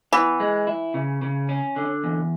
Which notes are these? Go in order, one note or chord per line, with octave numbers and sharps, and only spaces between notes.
E3 B3
G#3
E4
C#3
C#3
C#4
D3
E2